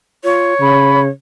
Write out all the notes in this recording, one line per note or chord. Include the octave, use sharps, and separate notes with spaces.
F4 C#5
C#3 B5